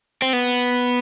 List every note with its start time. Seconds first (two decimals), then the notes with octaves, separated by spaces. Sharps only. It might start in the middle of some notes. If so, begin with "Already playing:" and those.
0.22 C4
0.33 B3